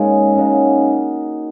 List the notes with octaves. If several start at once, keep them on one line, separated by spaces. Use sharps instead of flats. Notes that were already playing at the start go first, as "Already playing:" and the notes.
Already playing: G#2 C#3 G#3 A#3 D#4
C#3 G#3 D#4 F#4